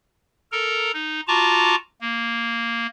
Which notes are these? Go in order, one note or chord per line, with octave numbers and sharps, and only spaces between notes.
A4 A#4 A#5
D#4
F4 F#4 A5 A#5 C#6 D6
A#3